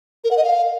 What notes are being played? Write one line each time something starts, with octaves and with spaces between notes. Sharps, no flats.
A#4
F#5
D#5
F5